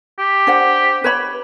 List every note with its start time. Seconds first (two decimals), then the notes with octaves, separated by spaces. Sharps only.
0.19 G4
0.47 D4 C5 F#5
1.04 B4 C#5 B5